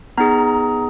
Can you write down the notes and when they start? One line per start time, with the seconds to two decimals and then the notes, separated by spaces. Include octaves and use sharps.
0.18 B3 D#4 G#4 A#5